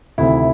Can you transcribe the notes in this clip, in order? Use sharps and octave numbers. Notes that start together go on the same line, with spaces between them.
D2 C3 D#3 E4